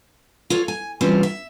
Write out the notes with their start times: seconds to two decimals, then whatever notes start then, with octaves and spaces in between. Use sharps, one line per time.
0.50 F4 A4 C#5
0.68 G#5
1.01 E3 G3 C4 C#4 F4
1.23 E5